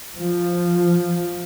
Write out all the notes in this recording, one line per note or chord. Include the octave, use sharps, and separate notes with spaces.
F3